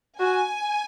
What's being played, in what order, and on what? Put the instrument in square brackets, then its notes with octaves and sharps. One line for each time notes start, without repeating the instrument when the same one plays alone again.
[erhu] F#4 [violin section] G#5